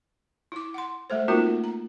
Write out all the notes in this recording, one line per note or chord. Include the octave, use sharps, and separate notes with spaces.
E4 D6
F#5 C6
G#3 A3 A4 C5
A#3 C4 D#4 F4 F#4 A#4
A3
A#5